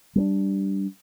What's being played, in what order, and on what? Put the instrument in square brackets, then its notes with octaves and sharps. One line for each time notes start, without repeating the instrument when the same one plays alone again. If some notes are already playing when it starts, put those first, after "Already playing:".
[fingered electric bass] G3 A#3 D4